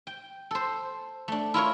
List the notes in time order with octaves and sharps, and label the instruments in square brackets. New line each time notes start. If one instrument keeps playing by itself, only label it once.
[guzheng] G5
A4 C5
A3 D4
E4 F4 A#4 C#5